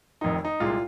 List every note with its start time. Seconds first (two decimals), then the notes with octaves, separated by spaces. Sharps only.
0.21 F1 F2 D#3 D#4
0.45 D#4
0.60 C2 A#2 G#3 F4